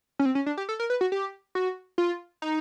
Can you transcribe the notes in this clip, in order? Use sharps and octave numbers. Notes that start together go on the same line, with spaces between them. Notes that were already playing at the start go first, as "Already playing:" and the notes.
C#4
C4
C#4
D4
G4
A4
A#4
B4
F#4
G4
F#4
F4
D#4